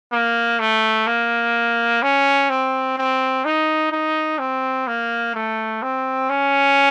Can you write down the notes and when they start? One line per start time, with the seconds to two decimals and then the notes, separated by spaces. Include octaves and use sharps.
0.12 A#3
0.59 A3
1.07 A#3
2.02 C#4
2.49 C4
2.98 C4
3.45 D#4
3.92 D#4
4.39 C4
4.87 A#3
5.34 A3
5.82 C4
6.29 C#4